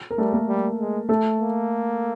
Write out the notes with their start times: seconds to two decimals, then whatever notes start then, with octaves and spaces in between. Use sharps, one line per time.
0.11 A#4
0.18 G3 A3 A4
0.33 A#3 A#4
0.48 G3
0.79 G#3
1.09 A3 A4
1.39 A#3